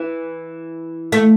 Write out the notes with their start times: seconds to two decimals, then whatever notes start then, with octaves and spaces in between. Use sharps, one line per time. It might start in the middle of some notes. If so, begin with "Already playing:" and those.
Already playing: E3
1.12 A3